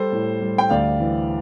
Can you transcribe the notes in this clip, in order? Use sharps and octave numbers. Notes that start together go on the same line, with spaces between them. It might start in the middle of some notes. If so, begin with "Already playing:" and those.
Already playing: G3 A4 C5
A2
G3
G5
D2 D5 F5
E3